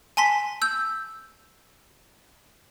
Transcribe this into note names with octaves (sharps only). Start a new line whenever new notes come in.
G#5 A5 C6 B6
E6 G6